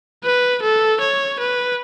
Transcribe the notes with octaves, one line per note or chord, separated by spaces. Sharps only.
B4
A4
C#5
B4